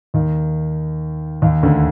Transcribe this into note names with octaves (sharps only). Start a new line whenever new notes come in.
D#2 D#3
D#2 D#3
D2 D3